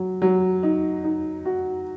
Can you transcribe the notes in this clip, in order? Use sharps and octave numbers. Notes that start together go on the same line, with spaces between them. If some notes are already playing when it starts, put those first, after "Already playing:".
Already playing: F#3
F#3
D#4
D#4
F#4